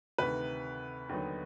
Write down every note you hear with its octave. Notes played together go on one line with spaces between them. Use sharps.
D2 C3 D#3 B4
D#2 D3 F#3 B3 D#4